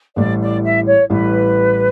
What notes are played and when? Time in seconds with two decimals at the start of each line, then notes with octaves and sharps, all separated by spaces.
0.16 A1 A2 G3 D5
0.40 D5
0.64 E5
0.86 C#5
1.10 A1 A2 G3 B4